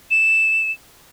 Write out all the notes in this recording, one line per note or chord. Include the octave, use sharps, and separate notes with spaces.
E7